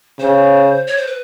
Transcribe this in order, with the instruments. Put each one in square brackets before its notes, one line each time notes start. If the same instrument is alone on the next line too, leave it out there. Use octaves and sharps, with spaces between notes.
[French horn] C#3 [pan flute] C5
[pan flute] C#5
C5
B4